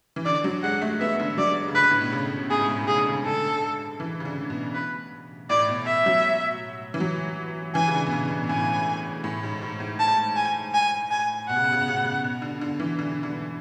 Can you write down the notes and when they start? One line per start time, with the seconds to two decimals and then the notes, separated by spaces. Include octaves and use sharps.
0.16 E3
0.25 D3 D5
0.44 F#3
0.63 G#3 F#5
0.82 A3
1.00 B3 E5
1.20 D3
1.38 F#3 D5
1.68 C#3
1.75 D3 B4
1.90 A2
2.01 B2
2.12 C#3
2.50 A2 G#4
2.60 G#2
2.70 A2
2.88 C#3 G#4
2.98 D3
3.08 C#3
3.25 D3 A4
4.00 E3
4.20 C#3
4.25 D3
4.50 B2
4.74 B4
5.50 A2 D5
5.69 B2
5.87 E5
6.06 F#3
6.94 E3
7.00 F#3
7.75 E3 G#5
7.87 C#3
7.94 D3
8.07 B2
8.13 C#3
8.31 B2
8.44 B2
8.49 A2 G#5
9.24 A2
9.43 G#2
9.62 G#2
9.80 A2
10.00 A5
10.36 G#5
10.74 G#5
11.11 G#5
11.49 B2 F#5
11.56 C#3
11.64 B2
11.72 C#3
11.81 B2
11.88 C#3
11.97 B2
12.04 C#3
12.12 B2
12.24 B2
12.42 D3
12.61 D3
12.80 E3
12.99 D3
13.23 D3